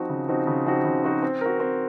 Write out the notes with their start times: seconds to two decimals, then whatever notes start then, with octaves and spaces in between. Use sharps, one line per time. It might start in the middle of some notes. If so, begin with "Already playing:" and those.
Already playing: F3 C4 D#4 F#4
0.09 C#3
0.28 F3 C4 D#4 F#4
0.47 C#3
0.66 F3 C4 D#4 F#4
0.85 C#3
1.04 F3 C4 D#4 F#4
1.23 C4
1.41 F#4 A#4
1.60 C4